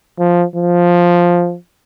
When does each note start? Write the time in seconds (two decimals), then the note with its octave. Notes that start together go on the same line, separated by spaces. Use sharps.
0.19 F3
0.56 F3